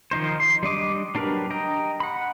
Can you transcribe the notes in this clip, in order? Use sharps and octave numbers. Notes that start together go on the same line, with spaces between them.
D#3 F3 D#4 C5
C6
G3 D4 D#5 D6
F#3 D4 G4 A#4 B4
D#5 G5 A#5
F#5 B5